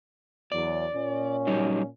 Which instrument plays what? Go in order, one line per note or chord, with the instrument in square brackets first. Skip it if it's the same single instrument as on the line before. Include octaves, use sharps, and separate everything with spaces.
[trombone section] E2 F#3 [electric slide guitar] D5
[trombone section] A#2 C#4
[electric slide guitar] F#3 G3 D#4